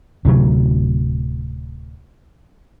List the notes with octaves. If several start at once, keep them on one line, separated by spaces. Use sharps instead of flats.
D1 D2 C3 F#3